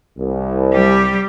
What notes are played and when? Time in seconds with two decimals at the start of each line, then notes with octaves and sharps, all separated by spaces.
0.18 C2
0.73 G3 G4